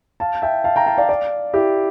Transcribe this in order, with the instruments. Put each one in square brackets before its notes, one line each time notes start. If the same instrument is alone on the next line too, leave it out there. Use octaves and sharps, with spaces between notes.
[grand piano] F5 A5
E5 G5
F5 A5
G5 A#5
F5 A5
D5 F5
D5 F5
E4 G4